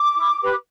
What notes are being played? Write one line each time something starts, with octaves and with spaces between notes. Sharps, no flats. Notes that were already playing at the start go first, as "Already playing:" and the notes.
Already playing: D6
E4
G4 B4